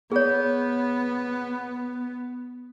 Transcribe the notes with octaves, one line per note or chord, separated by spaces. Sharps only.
B3 G#4 C#5